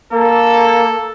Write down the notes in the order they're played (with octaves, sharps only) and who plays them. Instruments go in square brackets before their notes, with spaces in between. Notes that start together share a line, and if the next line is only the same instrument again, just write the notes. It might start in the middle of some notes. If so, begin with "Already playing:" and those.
[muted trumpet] A#3 [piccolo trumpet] A4